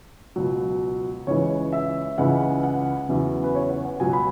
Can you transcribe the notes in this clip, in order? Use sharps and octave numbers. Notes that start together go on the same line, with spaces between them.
C#2 B2 F#3
C#2 C#3 E3 G#3 C#5
E5
C#2 C#3 E3 G#3 F#5
F#5
E2 C#3 F#3 E5
B4
C#5
F#4
F#5
C#2 B2 F#3 G#5
B5